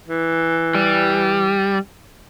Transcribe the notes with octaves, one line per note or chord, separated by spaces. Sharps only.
E3
G3